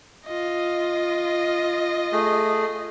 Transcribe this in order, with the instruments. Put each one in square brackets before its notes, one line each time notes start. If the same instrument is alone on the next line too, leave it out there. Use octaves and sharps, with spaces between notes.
[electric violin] F4 D#5
[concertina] A3 G#4